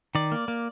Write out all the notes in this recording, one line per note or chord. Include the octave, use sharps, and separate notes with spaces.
D#3 D5
A#3
A#3